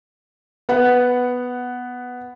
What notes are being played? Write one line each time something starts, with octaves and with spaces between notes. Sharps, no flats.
B3 F#5